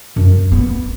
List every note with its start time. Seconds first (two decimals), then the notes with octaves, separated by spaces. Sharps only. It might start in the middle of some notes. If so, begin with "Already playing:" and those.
0.16 F#2
0.52 B3